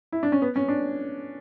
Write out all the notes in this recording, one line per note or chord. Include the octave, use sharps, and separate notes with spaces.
E4
D4
C#4
B3
C#4
D4